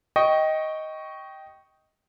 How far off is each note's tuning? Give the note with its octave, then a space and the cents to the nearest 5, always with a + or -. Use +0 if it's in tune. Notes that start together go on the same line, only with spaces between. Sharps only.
D#5 +10 G5 -10 C#6 +0